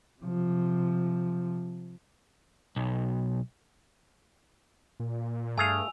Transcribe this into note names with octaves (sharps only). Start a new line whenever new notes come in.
C3 F3
B1
A#2
G2 A3 G#4 F5 G#5 E6 F7